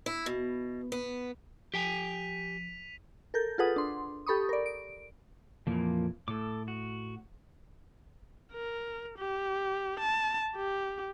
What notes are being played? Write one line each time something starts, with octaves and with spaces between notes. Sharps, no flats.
E4
B2
B3
F3 G4 G5 G#5 B6 D#7 F7
A4 A#4 G6
F4 G#4 A4 B4 F#5 D#6
D4 C6
G4 A4 B5 C#6 D#6
A#4 D5
D7
F2 A#2 E3 F3 A#3
A2 A4 D6
F#4
A#4
G4
A5
G4